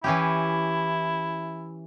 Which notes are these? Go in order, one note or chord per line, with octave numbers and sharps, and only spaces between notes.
E3 C#4 E4 G4